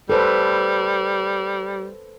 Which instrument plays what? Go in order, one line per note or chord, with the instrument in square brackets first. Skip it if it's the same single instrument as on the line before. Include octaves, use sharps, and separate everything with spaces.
[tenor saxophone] G3 [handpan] A4 B4 C5